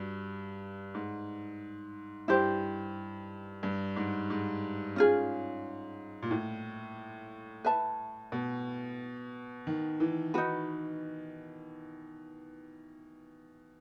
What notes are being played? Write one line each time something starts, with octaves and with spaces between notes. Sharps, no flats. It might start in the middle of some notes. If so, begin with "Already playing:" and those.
Already playing: G2 F#4
G#2
G2 E4 G4 C5
G2
G#2
G#2
C#4 F4 G#4
A#2
A2
B4 E5 A5
B2
D#3
E3
D#4 F#4 B4